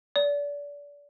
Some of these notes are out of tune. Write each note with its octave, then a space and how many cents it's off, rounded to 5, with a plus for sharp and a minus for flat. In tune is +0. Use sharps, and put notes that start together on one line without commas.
D5 -30